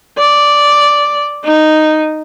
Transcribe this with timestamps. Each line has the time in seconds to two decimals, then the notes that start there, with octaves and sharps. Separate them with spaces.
0.18 D5
1.44 D#4